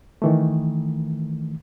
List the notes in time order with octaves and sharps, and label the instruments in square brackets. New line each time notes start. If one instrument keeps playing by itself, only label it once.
[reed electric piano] D#3 E3 A3